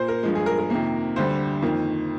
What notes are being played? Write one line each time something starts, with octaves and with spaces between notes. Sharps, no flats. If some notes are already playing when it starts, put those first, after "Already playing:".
Already playing: A#2 A#3 C5
A#4
G2 F3 G#3
G#4
A#4
A#4
F2 C3 D#3 A#3
D2 D3 G3 C5
F2 D#3 A#3